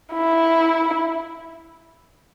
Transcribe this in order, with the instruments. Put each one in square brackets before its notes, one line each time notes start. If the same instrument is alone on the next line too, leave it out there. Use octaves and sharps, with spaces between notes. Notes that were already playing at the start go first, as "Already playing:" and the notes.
[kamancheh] E4